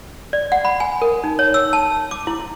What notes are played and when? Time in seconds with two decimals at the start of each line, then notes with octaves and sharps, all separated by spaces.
0.33 D5
0.52 F#5
0.65 B5
0.80 G#5
1.02 A#4
1.24 D#4
1.39 C#5
1.54 E6
1.73 A5
2.11 D6
2.27 E4